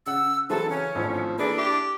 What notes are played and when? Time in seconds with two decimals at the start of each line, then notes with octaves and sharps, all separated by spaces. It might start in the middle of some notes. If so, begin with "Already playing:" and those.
0.06 C#3 F#5 E6
0.50 E3 F#3 C4 G#4 A4
0.70 C#3 C#4
0.95 G#1 A2 F3 D4
1.38 E3 A#3 D4 G#4 A4
1.58 E4 G4